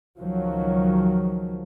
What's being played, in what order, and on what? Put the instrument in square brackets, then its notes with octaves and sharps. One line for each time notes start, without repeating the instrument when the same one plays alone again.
[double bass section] C#2 D#3 F3 F#3